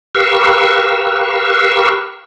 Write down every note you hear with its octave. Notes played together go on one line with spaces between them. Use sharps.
G4 A#4 B4 F5 C#6 E6